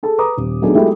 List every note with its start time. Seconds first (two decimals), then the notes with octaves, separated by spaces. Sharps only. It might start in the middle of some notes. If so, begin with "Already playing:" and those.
0.03 G#4 A4 A5
0.18 B4 A#5 D6 D#6
0.37 D#1
0.62 F#3 A3 B3 D4 D#4 G#4
0.75 F#3 G#3 A3 B3 E4 G4